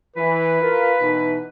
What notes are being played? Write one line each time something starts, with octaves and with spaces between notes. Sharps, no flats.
E3 B4
F4 A#4
B2 E3 D#4